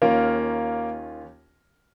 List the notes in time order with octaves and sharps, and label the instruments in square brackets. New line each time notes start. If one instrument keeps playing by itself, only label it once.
[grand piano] D#2 D#3 A#3 C#4 F4 A#4